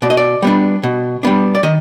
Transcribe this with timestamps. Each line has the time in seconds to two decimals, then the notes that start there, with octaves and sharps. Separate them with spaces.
0.02 B2 D5
0.10 D#5
0.17 D5
0.42 G3 B3 D4
0.83 B2
1.23 G3 B3 D4
1.55 D5
1.63 D#3 D#5